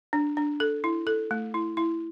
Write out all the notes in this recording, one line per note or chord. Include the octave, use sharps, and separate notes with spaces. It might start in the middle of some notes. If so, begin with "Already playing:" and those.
D4
D4
A4
E4
A4
A3
E4
E4